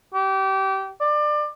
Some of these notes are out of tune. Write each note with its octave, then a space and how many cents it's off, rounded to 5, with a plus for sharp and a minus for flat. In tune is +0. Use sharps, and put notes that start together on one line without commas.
G4 -25
D5 +25